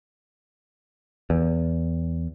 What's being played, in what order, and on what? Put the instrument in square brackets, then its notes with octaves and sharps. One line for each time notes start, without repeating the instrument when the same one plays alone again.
[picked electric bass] E2